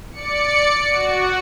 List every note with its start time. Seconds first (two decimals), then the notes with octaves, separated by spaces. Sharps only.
0.11 D5 C#7
0.91 F#4